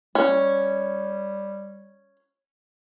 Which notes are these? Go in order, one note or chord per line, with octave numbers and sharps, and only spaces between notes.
G3 C#4